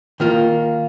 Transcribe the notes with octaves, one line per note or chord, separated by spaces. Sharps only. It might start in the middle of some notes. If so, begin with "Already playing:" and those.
D#3 A#3 F4